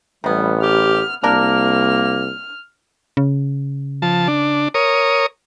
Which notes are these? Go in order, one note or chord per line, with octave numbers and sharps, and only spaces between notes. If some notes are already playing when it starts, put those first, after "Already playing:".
A1 C3 G3 B3
G4 F6
C2 A#3 D4 A#4 F6
C#3
F3 A5
D4
A#4 C#5 D#6